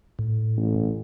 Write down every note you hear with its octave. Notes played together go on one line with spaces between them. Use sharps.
A2
A1